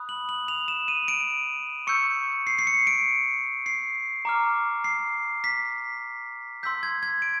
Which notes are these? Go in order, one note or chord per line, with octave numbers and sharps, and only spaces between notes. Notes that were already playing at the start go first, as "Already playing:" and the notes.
Already playing: B5 D#6 F#6
F#7
F#7
F7
E7
D#7
D7
C#6 E6 G6 C#7
C7
C7
C#7
D7
C7
A#5 D6 F6
C7
B6
C6 E6 G6 B6
G#6
G#6
D7